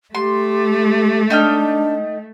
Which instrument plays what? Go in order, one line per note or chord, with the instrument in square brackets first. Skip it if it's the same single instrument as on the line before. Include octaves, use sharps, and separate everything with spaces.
[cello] A3 [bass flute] G4 [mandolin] C6
[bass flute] D4 [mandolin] D#4 G5 F6